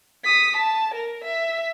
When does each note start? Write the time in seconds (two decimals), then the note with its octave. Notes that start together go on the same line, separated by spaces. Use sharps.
0.24 D#6 B6
0.57 A5
0.94 A#4
1.24 E5